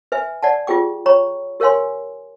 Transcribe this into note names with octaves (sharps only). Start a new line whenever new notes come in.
B4 E5 G#5
D5 F#5 A5
F4 G4 G#4 G5 D6
C#5 G5 A#5 B5 C#6
G4 A#4 C#5 F5 G#5 C6